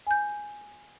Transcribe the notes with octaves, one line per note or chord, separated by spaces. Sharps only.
G#5 G6